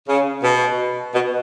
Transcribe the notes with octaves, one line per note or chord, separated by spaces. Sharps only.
C#3
B2
B2